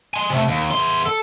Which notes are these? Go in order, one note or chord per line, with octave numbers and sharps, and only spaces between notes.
G#5 C6
C3 A3
D#2
E2 C6
A4